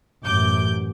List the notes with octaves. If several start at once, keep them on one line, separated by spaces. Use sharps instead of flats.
A1 F#2 D6 G6